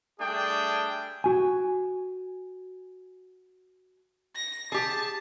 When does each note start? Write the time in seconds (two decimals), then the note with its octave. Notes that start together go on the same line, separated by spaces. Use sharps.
0.20 G3 A3 D4 G#4 G5
1.24 F#4 G#5
4.36 A#6
4.72 G4 G#4 A5